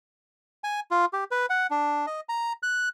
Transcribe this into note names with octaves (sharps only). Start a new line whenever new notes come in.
G#5
F4
G4
B4
F#5
D4
D#5
A#5
F#6